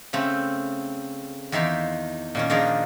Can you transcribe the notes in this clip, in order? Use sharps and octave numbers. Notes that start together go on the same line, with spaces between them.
C#3 A3 C4
E2 D#3 E5 F5 C6
A#2 D#3 C#4
D#3 F3 D4 G#4 A#4